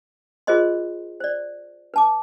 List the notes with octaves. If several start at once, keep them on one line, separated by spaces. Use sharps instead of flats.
F4 G#4 A#4 C5 D#5 C6
C5 D5
B4 A5 D6